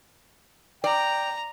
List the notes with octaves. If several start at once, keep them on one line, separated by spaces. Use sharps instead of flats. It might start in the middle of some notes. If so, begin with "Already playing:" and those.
D5 G5 A#5